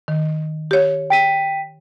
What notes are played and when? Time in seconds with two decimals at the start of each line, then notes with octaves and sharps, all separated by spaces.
0.08 D#3
0.71 G4 C#5
1.10 G5 B6 D#7